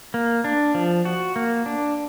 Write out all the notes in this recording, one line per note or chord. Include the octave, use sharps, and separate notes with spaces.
A#3
D4
F3
F#4
A#3
D4